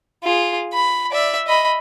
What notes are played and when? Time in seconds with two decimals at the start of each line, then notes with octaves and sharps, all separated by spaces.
0.24 F4 G#4
0.73 B5
1.12 D5 E5
1.47 D#5 B5